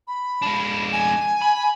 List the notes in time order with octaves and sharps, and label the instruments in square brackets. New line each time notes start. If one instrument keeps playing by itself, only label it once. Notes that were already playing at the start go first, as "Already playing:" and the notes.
[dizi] B5
[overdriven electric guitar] G#3 D4
[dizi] G#5
[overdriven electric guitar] B5